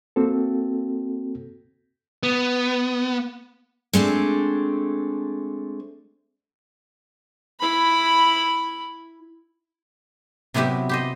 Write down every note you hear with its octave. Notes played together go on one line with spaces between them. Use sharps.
A#3 C4 F#4 A4
B3
G#3 A3 C4 D4
E4 B5
C3 F#3 B3 E4 G4 E5
G4 C5 D#5